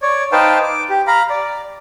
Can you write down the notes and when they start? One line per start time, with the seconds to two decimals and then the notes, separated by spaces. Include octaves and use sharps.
0.02 C#5 D5
0.32 D#4 B4 C5 F5 G5 A5
0.63 D6
0.90 G4
1.07 F5 A#5 B5
1.30 D5